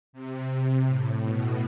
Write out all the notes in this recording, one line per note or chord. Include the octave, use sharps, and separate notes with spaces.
C3
A2
B2